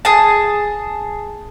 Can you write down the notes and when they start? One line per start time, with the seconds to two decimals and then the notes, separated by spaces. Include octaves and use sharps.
0.05 G#4 A5